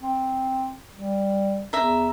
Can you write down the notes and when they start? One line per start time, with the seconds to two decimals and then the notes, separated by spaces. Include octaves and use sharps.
0.02 C4
0.96 G3
1.73 E2 E5 A#5